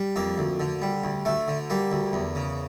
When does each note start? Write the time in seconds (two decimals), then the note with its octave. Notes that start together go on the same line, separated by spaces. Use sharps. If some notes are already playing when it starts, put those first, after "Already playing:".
Already playing: G3
0.16 F2 A#3
0.38 D2
0.60 D3
0.82 G3
1.04 D2
1.25 D2 A3
1.48 D3
1.70 G3 A#3
1.92 D2
2.13 E2
2.36 C#3